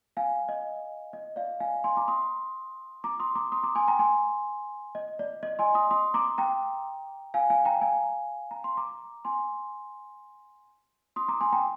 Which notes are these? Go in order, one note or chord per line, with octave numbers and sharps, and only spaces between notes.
F5 G#5
D#5
D#5
D5 F5
F5 G#5
G#5 C6
A#5 D6
C6 D#6
A#5 D6
C6 D#6
A#5 D6
C6 D#6
A#5 D6
G#5 C6
G5 A#5
G#5 C6
D#5
D5
D#5
G#5 C6
C6 D#6
C6 D#6
A#5 D6
G5 A#5
F5 G#5
F5 G#5
G5 A#5
F5 G#5
A#5
C6
A#5 D6
G#5 C6
C6 D#6
A#5 D6
G#5 C6
G5 A#5